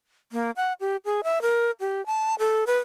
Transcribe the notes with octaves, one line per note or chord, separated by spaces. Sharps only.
A#3
F#5
G4
G#4
E5
A#4
G4
A5
A4
B4